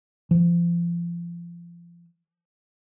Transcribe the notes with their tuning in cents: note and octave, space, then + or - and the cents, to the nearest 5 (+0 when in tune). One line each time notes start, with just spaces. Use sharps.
F3 -30